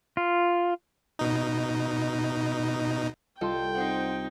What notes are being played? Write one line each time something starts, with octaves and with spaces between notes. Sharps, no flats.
F4
B2 D#4
C2 F4 A4 D#5 G5 C6
C4 D#4 C5 F#5